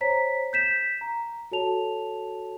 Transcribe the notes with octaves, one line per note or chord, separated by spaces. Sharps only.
C5 C#5 A#5 B6
G6 B6 E7
A#5
F#4 A4 C#5 A5 F7